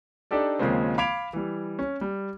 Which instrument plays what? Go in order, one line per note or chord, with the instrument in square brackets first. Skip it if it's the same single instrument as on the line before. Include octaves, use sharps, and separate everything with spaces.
[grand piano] D4 D#4 G4 A4 D5
D#2 C#3 F3 G#3 A#3 C4
F5 B5 D6 G#6 D7 F7
E3 G3
C#4
G3